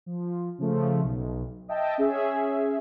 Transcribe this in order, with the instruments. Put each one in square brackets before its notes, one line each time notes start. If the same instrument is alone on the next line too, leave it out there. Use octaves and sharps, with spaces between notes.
[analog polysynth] F3
C#3 F3 A3
B1
D#5 E5 G5 A5
C#4 G#4 E5